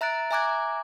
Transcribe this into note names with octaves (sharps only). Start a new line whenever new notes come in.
E5 A#5 F#6 A6 D7
E5 G#5 A#5 D6 F#6 G#6